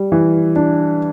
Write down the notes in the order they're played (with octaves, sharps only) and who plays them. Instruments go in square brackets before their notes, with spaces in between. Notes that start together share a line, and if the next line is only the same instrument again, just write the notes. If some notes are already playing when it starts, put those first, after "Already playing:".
Already playing: [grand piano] G3
E3
D4